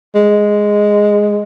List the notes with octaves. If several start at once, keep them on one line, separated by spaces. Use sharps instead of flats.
G#3